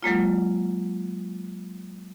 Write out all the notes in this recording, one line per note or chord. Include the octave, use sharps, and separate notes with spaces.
F#3 G#3 A#3 F4